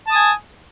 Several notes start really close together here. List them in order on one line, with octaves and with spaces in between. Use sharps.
A5 D#6 G#5